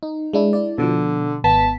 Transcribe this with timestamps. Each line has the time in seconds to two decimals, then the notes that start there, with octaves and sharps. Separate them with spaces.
0.03 D#4
0.33 G#3 D4 E4
0.53 E4 D5
0.78 B2 D3 F3
1.44 G#1 B3 A5 B6